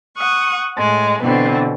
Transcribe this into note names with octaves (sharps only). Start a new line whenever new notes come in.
F#5 C#6 D#6
A2 G#3
B2 D3 E3 B3 C4